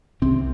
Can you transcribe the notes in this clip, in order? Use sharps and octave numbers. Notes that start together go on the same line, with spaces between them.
C2 C3 C4